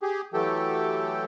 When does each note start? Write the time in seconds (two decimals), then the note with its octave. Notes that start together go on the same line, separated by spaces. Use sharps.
0.02 G4 G#4
0.34 E3 F#3 A3 G4 A4 G5